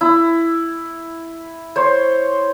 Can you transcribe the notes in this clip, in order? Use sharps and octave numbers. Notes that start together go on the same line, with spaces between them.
E4
C5 C#5